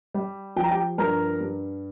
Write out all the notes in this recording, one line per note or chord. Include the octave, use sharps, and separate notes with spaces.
G3
F3 G5
A#5
G4 G5
G2 A#4 A#5
G2